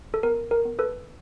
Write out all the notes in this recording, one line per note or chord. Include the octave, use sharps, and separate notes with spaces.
A4
B3 A#4
A#4
B3
A4 B4